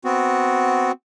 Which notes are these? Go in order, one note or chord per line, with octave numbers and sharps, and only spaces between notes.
B3 C4 F#4